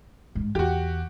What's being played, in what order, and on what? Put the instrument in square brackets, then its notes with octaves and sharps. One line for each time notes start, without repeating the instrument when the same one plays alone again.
[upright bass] G#2
[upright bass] E2 [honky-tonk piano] F#4 G4